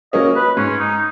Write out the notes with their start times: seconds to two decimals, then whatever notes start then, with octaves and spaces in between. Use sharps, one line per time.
0.13 F#3 A#3 C#4 D#5
0.36 B4
0.57 G#2 C#4
0.79 D#4